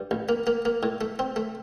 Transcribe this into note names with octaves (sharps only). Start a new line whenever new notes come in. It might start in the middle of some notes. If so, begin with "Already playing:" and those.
Already playing: G2
A1
A#3
A#3
A#3
A2
A3
C4
A3